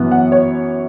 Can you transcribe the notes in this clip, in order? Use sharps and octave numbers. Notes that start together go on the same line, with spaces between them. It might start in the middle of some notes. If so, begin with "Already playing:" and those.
Already playing: F#2 E3 B3
F#5
C#5